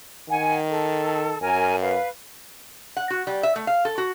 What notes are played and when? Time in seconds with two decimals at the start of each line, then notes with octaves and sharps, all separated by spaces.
0.29 D#3 F#5 G#5
0.69 A4
1.41 F#2 A#4 G#5
1.81 B4 F5
2.97 F#5
3.10 F#4
3.27 G3
3.43 E5
3.56 A3
3.67 F5
3.85 A4
3.98 F#4